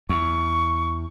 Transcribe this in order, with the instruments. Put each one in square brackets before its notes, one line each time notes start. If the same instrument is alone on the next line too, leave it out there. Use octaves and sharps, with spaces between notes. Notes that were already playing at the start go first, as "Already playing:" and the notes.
[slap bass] E2 [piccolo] C#6